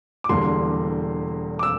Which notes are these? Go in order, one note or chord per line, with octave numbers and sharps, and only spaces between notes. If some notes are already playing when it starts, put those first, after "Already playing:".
D6
E1 E2 D3 G3 A#3 C6
D6
E6